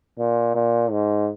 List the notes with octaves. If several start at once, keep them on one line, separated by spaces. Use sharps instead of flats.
A#2
A#2
G#2